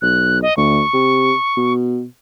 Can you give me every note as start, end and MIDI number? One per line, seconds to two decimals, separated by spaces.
0.02 0.43 35
0.02 0.41 90
0.42 0.56 75
0.57 0.81 38
0.57 1.73 85
0.93 1.32 48
1.56 2.05 47